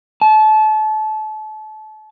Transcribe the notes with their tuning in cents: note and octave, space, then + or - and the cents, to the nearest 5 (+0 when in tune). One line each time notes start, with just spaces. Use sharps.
A5 -30